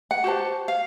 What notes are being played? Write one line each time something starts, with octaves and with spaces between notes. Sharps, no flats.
F#5
F#4 G4 C5 A5
F5